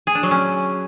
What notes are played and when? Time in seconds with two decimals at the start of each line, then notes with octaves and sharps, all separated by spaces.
0.07 G#4
0.15 D4
0.23 F#3
0.31 C#4